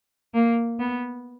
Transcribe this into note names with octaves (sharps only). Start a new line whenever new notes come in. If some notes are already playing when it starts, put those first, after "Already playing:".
A#3
B3